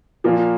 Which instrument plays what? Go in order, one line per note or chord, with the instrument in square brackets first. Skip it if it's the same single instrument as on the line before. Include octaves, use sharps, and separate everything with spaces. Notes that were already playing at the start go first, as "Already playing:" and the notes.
[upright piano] A#2 F3 A#3 F4